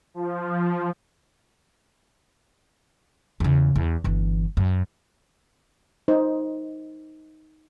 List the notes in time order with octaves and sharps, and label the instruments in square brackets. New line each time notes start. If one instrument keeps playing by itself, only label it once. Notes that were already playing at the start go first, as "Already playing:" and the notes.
[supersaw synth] F3
[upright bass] E2 C#3
E2
G1 E3
F#2
[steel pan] D#4 C5